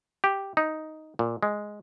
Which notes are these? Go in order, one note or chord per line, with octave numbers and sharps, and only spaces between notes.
G4
D#4
A#2
G#3